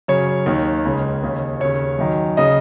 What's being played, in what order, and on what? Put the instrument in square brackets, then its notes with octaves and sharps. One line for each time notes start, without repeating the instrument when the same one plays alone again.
[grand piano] F#2 C#3 C#5
D#2 D#3
C#2 C#3
D#2 C#3
D#2 C#3 C#5
F#2 D#3
C#3 D#5